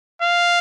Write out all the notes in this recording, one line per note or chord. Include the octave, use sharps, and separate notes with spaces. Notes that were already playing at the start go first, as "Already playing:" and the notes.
F5